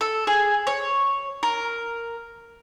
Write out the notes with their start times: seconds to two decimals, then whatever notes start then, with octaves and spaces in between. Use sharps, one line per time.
0.01 A4
0.27 G#4
0.67 C#5
1.43 A#4